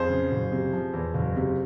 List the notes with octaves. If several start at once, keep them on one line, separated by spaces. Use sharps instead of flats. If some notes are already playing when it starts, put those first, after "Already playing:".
Already playing: F2 G#4 C5
C#3
F#1
C3
F3
E2
F#1
C3